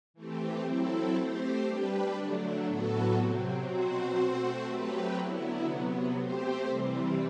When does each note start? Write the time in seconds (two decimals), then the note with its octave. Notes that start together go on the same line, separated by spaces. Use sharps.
0.14 E3 A3 C4 G4
0.65 F#3 C4 E4 A4
1.15 A3 C4 G4 C5
1.64 G3 D4 G4 B4
2.15 D3 F#3 A3 D4
2.65 A2 F#3 B3 F#4 A4
3.15 C3 F#3 C4
3.65 B2 F#3 C4 F#4 C5
4.15 A3 C4 F#4 C5
4.65 F#3 A3 C4 G4 B4
5.15 D3 F#3 B3 E4
5.65 C3 F#3 B3
6.16 A3 C4 G4 C5
6.66 C3 E3 G3 C4